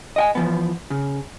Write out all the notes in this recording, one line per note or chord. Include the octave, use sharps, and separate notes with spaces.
D#5 G5 G#5
E3 F3 B3
C#3